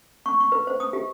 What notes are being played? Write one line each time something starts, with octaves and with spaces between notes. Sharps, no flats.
C#6
C#6
B4
C5
D#6
G4